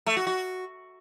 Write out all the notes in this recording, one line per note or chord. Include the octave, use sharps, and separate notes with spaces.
A3
F#4
F#4